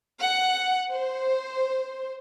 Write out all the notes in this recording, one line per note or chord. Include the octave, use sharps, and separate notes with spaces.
F#5
C5